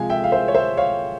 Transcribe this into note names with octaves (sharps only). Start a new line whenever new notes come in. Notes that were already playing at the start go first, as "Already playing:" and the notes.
Already playing: C3 F3 G#3 F5 G#5
E5 G5
F5
C5 E5
C#5
C5 E5
C#5 F5